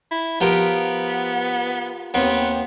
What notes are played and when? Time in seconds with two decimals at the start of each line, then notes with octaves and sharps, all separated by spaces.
0.11 E4
0.40 F3 B3 G4 A#4
2.14 D#2 B3 C4